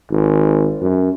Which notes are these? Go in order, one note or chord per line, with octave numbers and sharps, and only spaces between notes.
G#1
F#2